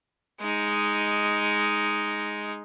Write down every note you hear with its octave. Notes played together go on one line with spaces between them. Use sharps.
G#3 D#4